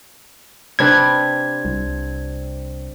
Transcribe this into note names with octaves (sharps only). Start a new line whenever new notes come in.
C3 D4 B4 G#6
C2